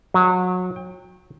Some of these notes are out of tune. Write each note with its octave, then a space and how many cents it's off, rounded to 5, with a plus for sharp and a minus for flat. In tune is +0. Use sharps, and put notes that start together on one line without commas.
F#3 -25
G5 +20